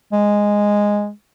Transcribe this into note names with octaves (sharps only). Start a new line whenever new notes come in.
G#3